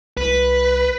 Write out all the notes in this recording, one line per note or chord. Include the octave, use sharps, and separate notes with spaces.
C2 B4